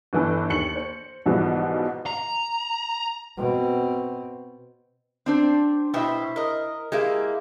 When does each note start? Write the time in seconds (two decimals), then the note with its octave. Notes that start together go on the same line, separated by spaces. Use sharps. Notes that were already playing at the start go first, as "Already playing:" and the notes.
0.13 G1 E3 A4
0.50 D#2 C#7 F#7
0.76 C5
1.26 B1 G#2 B2 E3 F3 G3
2.06 A#5
3.37 B2 C4
5.26 C4 D4 C5
5.94 B2 E4 G4 C5 E5
6.36 A#4 D#5
6.92 G#3 A#3 E4 G4